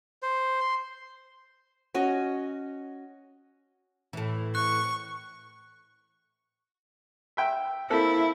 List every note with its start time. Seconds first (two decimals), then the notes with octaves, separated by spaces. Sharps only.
0.22 C5
0.60 C6
1.95 C#4 F#4 D#5
4.13 A2 E3
4.55 C#6 F#6
7.37 E5 G5
7.90 A#3 C4 E4 A4